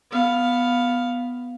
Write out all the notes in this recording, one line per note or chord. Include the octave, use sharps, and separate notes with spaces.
B3 F5